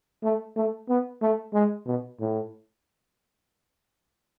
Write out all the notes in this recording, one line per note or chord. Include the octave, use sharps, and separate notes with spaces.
A3
A3
B3
A3
G#3
B2
A2